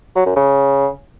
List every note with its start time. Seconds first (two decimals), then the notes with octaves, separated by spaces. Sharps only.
0.16 F#3
0.26 F#2
0.36 C#3